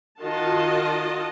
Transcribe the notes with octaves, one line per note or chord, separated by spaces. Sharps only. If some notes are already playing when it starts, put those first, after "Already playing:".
D#3 F4 F#4 D#5 A5